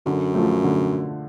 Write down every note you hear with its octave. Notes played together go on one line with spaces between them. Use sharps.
F#2 D3
F3 A3
D3